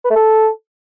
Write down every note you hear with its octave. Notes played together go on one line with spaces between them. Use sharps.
B4
A3
A4